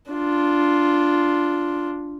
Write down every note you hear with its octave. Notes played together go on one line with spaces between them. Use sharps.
D4 F4